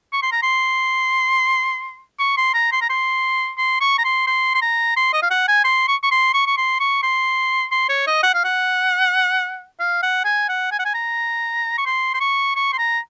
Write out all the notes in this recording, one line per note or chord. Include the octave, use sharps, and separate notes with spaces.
C#6
C6
A#5
C6
C#6
C6
A#5
C6
A#5
C6
C6
C#6
A#5
C6
C6
C6
A#5
C6
D#5
F5
F#5
G#5
C6
C#6
C#6
C6
C#6
C#6
C6
C#6
C6
C6
C#5
D#5
F#5
F5
F#5
F5
F#5
G#5
F#5
G#5
F#5
G#5
A#5
C#6
C6
C6
C#6
C#6
C6
A#5